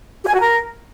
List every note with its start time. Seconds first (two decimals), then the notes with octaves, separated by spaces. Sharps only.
0.23 G4
0.29 G#5
0.34 F#4
0.39 A#4